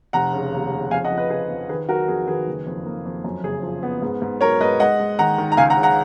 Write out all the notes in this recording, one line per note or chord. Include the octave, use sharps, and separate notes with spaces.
F1 F#5 A#5
C#3
D#2
C#3
F2 F5 G#5
D#5 F#5
F3
B4 D#5
C#3 G#4 B4
F2
D#3 G#4 B4
F#3 F#4 A#4
F2 G#4
D#3 G#4 B4
F#1
F2
A#3
F2
F#2
F#1 G#4
F3
B3
G#2
G#2
F#3 A#4 C#5
G#2 B4 D#5
G#3 D#5 F#5
G#3
D#3 F#5 A#5
D#3
A#5
C#2 F5 G#5
F#5 A#5
C#3
F#5 A#5